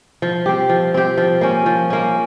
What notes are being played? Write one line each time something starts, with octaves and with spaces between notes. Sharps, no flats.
F3
C4 G4
F3
C4 G4
F3
A#3 C#4
F3
A#3 C#4